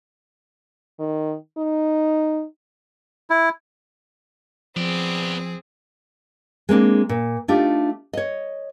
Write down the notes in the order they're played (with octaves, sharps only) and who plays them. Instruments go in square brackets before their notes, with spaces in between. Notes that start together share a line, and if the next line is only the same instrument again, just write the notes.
[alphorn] D#3
D#4
[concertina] E4
[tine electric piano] F3 [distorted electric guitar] B3 D5 [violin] C4 G#4
[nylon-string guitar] G#3 A#3 C4 D4
A#2
A3 D4 D#4 F4 G4
C#5 D#5